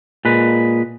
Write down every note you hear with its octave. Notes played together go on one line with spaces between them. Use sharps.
A#2 G#3 B4